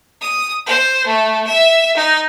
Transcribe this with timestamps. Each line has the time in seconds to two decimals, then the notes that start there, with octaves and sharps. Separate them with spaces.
0.21 D#6
0.66 C5
1.07 A3
1.47 E5
1.97 D#4